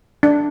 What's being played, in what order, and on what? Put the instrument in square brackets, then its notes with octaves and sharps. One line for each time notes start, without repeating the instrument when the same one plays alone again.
[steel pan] D4